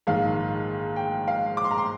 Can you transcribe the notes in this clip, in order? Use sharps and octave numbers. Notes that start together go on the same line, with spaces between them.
A#1 G#2 D#3 F5
G5
F5
D6
C6
A#5
C6